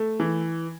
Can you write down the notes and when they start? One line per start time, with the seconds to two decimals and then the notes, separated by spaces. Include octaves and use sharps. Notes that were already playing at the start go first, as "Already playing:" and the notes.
Already playing: A3
0.20 E3